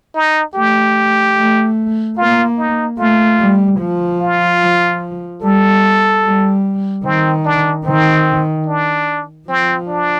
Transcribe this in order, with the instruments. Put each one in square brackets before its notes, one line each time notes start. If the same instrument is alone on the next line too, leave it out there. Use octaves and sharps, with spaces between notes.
[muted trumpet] D#4
[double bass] A3 [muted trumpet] G4
[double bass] A3
[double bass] A#3 [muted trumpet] F4
[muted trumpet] D#4
[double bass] A3 [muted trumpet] F4
[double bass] G3
F3
[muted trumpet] F4
[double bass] F3
[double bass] G3 [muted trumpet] A4
[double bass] G3
[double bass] D#3 [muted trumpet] C4
[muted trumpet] D4
[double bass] D#3 [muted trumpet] C4
[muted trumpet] D4
[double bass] F3 [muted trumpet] C4
[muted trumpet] D4